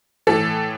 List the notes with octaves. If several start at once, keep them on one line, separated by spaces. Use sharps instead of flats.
A2 E3 A4